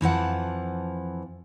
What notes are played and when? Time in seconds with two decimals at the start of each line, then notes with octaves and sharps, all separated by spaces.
0.01 F2 E3 F3 F#5